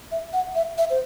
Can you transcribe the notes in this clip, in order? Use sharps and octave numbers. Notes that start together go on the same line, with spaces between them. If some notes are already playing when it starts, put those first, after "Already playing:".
E5
F#5
E5
E5
C5